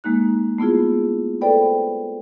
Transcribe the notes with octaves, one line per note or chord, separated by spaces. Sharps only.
G#3 A#3 D#4 F#6
A3 B3 E4 F4 G#4
A4 B4 C5 D5 G5 B5